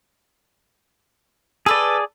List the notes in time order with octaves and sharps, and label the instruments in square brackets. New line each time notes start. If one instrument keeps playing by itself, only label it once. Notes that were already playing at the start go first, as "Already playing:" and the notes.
[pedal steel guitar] G#4 D5 [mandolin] A4 B4